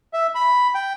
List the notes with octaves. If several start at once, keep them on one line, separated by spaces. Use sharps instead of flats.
E5
B5
G5